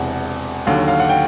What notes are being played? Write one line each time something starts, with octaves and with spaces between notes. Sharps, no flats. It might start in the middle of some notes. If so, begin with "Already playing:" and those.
Already playing: E1 E2 C3 F#5
D#2 D3 F#3 F5
F5
F#5
G5